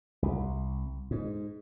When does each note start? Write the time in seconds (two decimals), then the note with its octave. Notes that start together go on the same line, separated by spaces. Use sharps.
0.22 C2
1.11 G#2